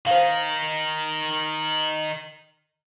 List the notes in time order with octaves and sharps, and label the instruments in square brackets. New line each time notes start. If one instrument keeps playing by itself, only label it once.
[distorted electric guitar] D#3 D#4 [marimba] C5 F5